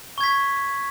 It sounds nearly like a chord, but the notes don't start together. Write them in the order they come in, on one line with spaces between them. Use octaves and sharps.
C#6 G#6 B6